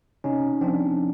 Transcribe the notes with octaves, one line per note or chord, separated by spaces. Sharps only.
C3 C#4 D#4
F3 C4 D4